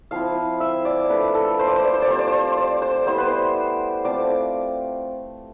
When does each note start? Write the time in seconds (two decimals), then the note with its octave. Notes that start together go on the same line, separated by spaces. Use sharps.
0.11 F3 C4 E4 F5
0.60 E5
0.85 D5
1.09 A3 D4 F4 B4
1.35 A4
1.59 C5
1.68 D5
1.76 C5
1.84 D5
1.94 C5
2.02 D5
2.07 G3 C4 F4 C5
2.19 D5
2.27 C5
2.57 D5
2.82 C5
3.06 G3 B3 E4 C5
3.18 B4
3.28 C5
4.05 A3 C4 F4 D5